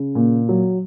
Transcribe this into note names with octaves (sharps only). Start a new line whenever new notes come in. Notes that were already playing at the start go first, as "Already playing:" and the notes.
Already playing: C#3
A#2
F#3